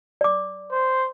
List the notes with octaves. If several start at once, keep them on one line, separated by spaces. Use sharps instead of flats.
D5 D6
C5